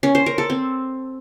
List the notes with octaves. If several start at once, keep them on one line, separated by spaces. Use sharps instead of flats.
C#4
C5
A#4
A4
C4